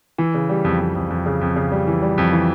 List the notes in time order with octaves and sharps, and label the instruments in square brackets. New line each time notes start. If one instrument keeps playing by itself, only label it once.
[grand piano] E3
C#3
G3
F2
F2
F2
F2
C#3
F2
C#3
G3
E3
G3
F2
E3